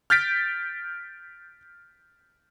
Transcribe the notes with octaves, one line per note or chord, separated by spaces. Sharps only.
F6 G6 A6 B6 D7